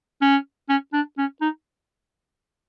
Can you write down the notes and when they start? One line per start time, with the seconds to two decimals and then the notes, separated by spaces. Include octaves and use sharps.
0.22 C#4
0.69 C#4
0.93 D4
1.18 C#4
1.41 D#4